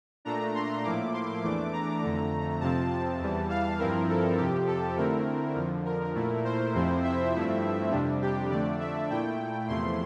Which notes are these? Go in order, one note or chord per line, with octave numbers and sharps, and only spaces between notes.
A#2 A3 D4 A#5
C6
A2 F3 A#3 E4 D6
C6
E2 E3 A3 D4 D6
A#5
F2 D3 A3
F2 C3 F3 C4 A5
A5
E2 E3 G3
F5
G2 F3 C4 E4 A#4
A4
F2 C3 F3 G4
A4
D3 A3 C4 E4 A#4
F2 D3 F3
A#4
A#2 A3 E4
C5
F2 C3 F3 C4 E4
E5
G2 F3 A3 C4 E4
F2 C3 G3 D4
G4
F2 D3 A3 D4 D5
E5
A#2 A3 E4 G5
E2 C3 F3 A3 E4 C6